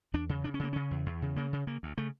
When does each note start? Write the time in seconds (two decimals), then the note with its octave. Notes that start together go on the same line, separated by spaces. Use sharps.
0.14 E2 D4
0.29 C#3
0.44 C#3 D4
0.54 C#4
0.59 C#3 A#3
0.73 C#3 C#4
0.91 E2
1.06 E2
1.22 C#3
1.36 C#3 A#3
1.53 C#3
1.67 C#3 A#3
1.83 D2
1.98 C#3 A3